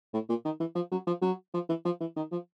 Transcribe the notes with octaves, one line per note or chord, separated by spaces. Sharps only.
A2
A#2
D#3
E3
F3
F#3
F3
F#3
F3
E3
F3
E3
D#3
F3